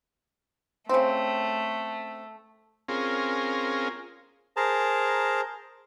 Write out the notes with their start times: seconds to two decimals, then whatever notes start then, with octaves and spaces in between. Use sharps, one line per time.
0.89 C#3 A3 C4
2.88 C4 C#4 F4 G#4 A#4
4.57 G#4 A#4 C5 A5 A#5